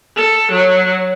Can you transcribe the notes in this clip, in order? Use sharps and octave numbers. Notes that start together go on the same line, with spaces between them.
A4
F#3